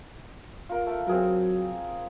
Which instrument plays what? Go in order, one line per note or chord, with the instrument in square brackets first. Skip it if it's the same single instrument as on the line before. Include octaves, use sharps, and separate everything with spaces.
[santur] F4 A#4
A3
[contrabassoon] F#3 [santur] C4 G#4 A#4